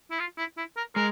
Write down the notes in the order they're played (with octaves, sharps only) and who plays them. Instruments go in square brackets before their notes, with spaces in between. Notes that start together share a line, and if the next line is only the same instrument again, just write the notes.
[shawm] E4
F4
E4
E4
A#4
[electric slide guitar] G#3 [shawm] A#4